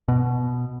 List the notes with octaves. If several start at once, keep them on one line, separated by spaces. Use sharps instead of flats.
B2